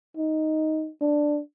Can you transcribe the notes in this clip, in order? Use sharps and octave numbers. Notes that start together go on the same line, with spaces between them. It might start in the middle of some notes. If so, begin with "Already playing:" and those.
D#4
D4